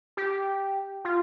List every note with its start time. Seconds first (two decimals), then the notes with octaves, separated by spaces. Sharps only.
0.17 G4
1.05 F4